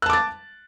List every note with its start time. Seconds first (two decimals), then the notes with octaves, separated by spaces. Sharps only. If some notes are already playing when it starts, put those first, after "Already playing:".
0.02 F#6
0.06 A5
0.10 D6
0.13 A6